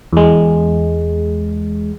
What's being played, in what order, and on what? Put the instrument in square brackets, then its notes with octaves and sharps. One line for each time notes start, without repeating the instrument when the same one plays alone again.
[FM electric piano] E2 G#3